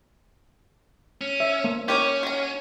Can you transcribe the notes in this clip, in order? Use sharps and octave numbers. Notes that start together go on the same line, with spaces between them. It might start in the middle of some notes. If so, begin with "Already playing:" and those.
C#4
E5
A#3
C#4 G4 A#4 C#5
F#3 A#5